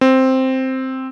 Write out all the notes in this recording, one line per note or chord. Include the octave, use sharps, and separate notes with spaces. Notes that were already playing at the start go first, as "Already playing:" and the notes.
C4